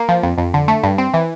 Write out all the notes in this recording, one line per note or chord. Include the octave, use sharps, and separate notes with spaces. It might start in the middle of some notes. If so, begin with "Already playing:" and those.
Already playing: A#3
F3
F2
F2
D3
A3
G2
C4
E3